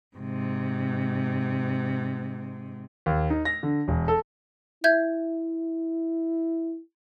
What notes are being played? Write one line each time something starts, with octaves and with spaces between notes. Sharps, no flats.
G#2 C3
D#2
D#4
A#6
D3
E1
A4
E4 E5 G6 G#6